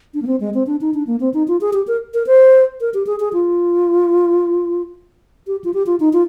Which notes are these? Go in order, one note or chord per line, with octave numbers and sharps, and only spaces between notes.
D4
A#3
C4
G#3
C4
D4
D#4
D4
A#3
C4
D#4
F4
G#4
G4
A#4
A#4
C5
A#4
G4
G#4
G#4
F4
G4
F4
G4
F4
D#4
F4